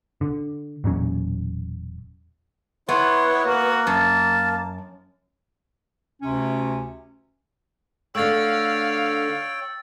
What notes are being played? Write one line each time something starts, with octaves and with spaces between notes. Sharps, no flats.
D3
E1 A#2 F#3 C#4
B3 E4 C#5 C6
A#3 F#4
F#2 A5
D2 C3 C#4
D3 A3 C#5 F5 G5 E6 A6